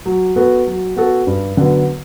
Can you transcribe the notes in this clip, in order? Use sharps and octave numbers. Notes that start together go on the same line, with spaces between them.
F#3
B3 F#4 A4
F#3
B3 F#4 A4
G2
D3 F#3 B3